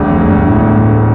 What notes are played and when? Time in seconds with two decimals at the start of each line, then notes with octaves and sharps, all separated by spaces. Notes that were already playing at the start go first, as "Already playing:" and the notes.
Already playing: E1 D2 D3 G3 D4
0.09 F2
0.29 G2
0.39 G2
0.48 A2